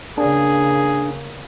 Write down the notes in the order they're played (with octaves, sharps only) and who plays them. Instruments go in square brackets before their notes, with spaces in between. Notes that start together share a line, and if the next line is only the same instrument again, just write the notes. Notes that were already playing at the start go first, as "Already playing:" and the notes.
[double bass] C#3 A#3 [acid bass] D4 [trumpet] G#4